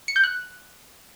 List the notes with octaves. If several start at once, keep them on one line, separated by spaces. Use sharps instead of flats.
C#7
G6
F#6